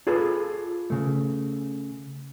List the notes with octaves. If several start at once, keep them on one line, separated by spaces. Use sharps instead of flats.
F4 G#4 A4 B4
C#3 A3